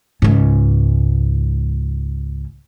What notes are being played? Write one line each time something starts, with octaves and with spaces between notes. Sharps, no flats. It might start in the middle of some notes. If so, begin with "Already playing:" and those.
C#2 G#2